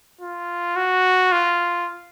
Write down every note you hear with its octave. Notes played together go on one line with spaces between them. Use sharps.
F4
F#4
F4